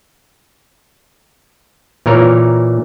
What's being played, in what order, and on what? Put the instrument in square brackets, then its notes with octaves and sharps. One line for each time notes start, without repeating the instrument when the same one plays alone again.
[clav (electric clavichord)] A#2 E3 A#4 C#5